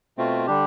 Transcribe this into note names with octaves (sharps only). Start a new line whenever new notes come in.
B2 A3 C4 F4
D3 G3 D4 G4